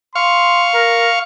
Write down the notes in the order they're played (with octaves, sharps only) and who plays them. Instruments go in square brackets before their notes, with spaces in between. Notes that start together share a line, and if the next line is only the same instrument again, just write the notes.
[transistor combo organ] F5 C#6 [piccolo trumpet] C6
[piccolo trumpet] A#4